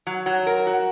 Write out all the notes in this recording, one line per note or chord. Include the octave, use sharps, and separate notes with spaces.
F#3
F#3
A#4
F#4